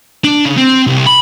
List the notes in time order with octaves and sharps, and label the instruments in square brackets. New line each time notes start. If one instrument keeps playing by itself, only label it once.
[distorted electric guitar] D4
C#3
C4
C2
B5